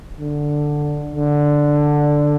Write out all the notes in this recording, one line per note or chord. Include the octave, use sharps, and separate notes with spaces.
D3
D3